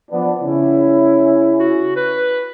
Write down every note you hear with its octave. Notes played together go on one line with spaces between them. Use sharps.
F3 B3 D4
C#3 C#4 E4
F#4
B4